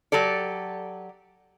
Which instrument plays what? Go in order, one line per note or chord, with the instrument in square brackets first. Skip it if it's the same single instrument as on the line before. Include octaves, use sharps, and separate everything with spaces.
[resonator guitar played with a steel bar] F#3 G4 A4 D5